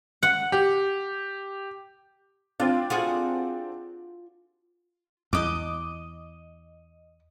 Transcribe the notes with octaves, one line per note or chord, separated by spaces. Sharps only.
F#5
G4
C4 D4 F4
F4 F#4 G#4
E2 D#5 D6